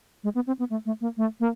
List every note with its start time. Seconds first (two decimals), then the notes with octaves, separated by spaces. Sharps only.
0.24 G#3
0.35 B3
0.47 C4
0.59 B3
0.70 A3
0.86 A3
1.01 A#3
1.17 A3
1.40 A#3